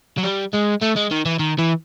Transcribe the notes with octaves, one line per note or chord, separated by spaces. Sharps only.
F#3
G3
G#3
A3
G#3
D#3
E3
D#3
E3